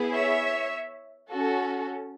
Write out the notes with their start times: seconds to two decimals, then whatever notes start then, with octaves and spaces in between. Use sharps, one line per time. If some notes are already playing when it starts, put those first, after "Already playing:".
Already playing: B3 E4 G#4
0.14 C#5 E5
1.31 C#4 F#4 A4